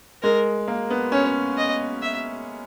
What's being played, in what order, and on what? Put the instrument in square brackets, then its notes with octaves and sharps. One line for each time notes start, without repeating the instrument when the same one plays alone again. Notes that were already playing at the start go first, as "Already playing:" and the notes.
[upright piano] G#3 [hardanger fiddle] A#4
[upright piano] A#3
B3
[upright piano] C#4 [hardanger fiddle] C#5
[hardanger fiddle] D#5
E5